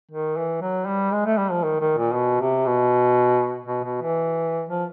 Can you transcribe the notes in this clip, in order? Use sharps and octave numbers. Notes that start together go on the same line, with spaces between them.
D#3
E3
F#3
G3
G#3
A3
G3
F3
D#3
D#3
A#2
B2
C3
B2
B2
B2
E3
F3